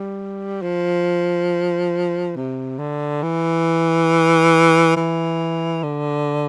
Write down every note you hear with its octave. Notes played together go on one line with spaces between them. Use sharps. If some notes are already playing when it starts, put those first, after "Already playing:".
Already playing: G3
F3
C3
D3
E3
E3
D3